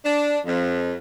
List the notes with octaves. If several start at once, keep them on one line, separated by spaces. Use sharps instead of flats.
D4
F2